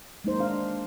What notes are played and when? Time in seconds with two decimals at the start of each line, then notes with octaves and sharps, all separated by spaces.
0.24 G#3 A#3 D#4 C5
0.40 D4 F5